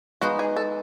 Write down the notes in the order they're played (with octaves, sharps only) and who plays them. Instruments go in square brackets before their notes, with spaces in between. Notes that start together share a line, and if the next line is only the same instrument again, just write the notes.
[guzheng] G#3 B3 D#4 [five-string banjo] F#4
[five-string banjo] G#4
A4